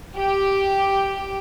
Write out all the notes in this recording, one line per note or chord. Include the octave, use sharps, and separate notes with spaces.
G4